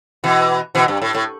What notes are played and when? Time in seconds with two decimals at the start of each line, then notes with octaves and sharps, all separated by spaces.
0.24 B2 E3
0.75 B2 E3
0.88 G2
1.02 A2
1.15 A2